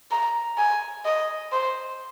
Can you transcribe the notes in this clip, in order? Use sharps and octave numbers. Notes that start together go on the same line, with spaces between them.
A#5
G#5
D#5
C5